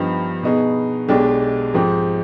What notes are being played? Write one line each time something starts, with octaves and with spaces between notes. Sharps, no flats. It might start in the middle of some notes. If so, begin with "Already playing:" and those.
Already playing: G2 F3 B3 D#4 G4
B2 B3 D#4 G#4
B1 B2 G#3 D4 G4
G#2 F3 C4 G4